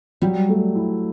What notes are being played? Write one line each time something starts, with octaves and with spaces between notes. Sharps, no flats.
F#3 G3
A3
E4